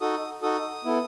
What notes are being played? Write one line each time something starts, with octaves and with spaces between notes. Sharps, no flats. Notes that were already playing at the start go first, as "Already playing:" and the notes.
D#4 F#4 A4 D#6
D#4 F#4 A4 D#6
B3 E4 A4